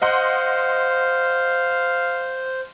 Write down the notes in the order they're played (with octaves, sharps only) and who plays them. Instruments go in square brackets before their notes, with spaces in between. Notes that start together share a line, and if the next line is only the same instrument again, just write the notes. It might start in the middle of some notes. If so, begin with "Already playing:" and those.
[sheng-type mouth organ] C5 [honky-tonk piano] D#5 F#5 C6 [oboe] F5